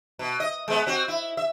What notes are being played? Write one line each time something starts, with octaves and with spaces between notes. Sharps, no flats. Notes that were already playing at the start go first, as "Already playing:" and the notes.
B2
D#5
G#3 B3
C4 F#4
E4
E5